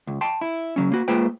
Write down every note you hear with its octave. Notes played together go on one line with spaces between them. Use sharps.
C#2
G5 A5 C6
E4
C#3 F#3 C#4
A#3 F#4
G#3 A#3 F4 B4 C5 G5